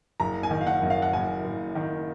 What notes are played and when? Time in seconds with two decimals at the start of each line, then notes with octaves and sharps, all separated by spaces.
0.20 F#1 A#5
0.43 G#5
0.51 D#3
0.61 F5
0.67 F#5
0.82 F#2
0.90 F5
1.02 F#5
1.13 F#1 G#5
1.45 F#1
1.75 D#3